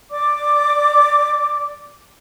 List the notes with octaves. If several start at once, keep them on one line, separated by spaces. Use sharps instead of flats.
D5 D6